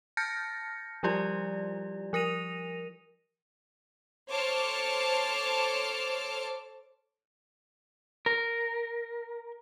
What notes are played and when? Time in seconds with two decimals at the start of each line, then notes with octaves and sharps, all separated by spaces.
0.17 A5 F6 G6 A6 A#6 C#7
1.03 F3 G3 E4 F4 G4 D5
2.13 F3 A#4 A#6 D#7 F7
4.31 A4 C5 C#5 A5 D6 F6
8.26 A#4